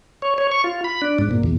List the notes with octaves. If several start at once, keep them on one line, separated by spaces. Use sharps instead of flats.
C#5
C#5
C#6
F4
B5
D4
G#2
A#2
E2